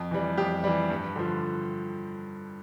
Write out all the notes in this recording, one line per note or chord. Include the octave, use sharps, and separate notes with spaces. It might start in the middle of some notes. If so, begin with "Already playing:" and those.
Already playing: F2
E3 G3
F2 G4
E3 G3
G2
D3 F3